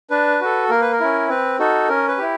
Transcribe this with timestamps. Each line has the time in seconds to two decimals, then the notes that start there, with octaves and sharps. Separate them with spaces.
0.10 D4 B4
0.41 F#4 A4
0.70 A#3 A#4
0.81 B4
0.92 A#4
1.00 C#4 E4
1.29 C4 B4
1.59 D#4 F#4 A4
1.89 C#4 A#4
2.08 B4
2.18 E4 G4